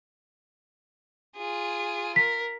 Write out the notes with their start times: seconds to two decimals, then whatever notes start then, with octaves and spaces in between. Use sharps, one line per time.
1.37 F4 G#4
2.16 A#4 B6